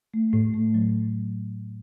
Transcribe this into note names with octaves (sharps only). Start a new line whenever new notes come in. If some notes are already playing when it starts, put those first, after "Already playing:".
A3
A2
A3
F#3